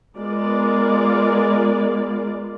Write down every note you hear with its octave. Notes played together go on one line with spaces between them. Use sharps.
G#3 B3 F4 A#4 D5